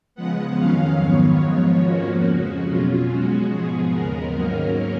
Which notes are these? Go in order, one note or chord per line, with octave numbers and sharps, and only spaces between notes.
C#3 F3 G#3 B3 F#5
F2 D#3 F#3 C#4 F5
G#2 D#3 F#3 B3 C#5
G#2 F3 G#3 B3
F2 F3 A#3 C#4 F#4
F2 C#3 G#3
B2 F#3 C#4 F4
B2 G#3 C#4 F#4
G#2 F3 B3 G#4
D#2 C#3 G#3 B3 A#4
G#2 D#3 F#3 A#3 C#4